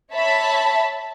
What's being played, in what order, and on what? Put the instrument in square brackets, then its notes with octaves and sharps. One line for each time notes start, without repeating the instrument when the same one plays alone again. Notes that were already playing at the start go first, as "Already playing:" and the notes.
[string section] C#5 E5 A5 B5